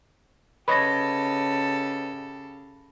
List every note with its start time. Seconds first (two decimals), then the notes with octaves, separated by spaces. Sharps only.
0.68 C#3 G4 A4 B4 C#5 D#5 B5 A#6